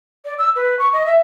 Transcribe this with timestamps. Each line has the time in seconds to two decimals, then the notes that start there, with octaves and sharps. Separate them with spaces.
0.25 D5
0.38 E6
0.55 B4
0.79 C#6
0.93 D#5
1.06 E5